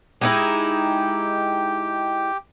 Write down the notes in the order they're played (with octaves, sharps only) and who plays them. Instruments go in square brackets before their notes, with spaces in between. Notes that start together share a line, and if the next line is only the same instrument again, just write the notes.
[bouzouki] G#3 D#4 E4 [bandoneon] G4 G5